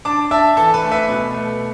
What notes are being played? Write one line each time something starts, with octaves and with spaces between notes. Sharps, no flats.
D4 A5 D6
D4 E5 A5
E3 A4
B4
A3
B4 E5
B2 B4
A3